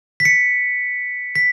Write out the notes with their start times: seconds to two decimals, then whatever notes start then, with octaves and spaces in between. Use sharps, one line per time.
0.20 B6
0.25 C#7
1.35 B6